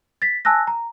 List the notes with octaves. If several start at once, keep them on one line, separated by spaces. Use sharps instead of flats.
A6 B6
G#5 A5 E6 F#6 A#6
A#5